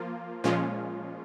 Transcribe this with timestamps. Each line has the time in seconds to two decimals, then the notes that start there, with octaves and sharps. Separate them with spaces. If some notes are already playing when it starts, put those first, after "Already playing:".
Already playing: F3 A#3 F4
0.44 A#2 F3 G#3 C#4 F4